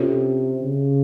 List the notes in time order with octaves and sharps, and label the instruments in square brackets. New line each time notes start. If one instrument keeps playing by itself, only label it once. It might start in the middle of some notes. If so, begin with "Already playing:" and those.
Already playing: [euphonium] C3 [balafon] C#4 F4 A4 C#5
[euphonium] C#3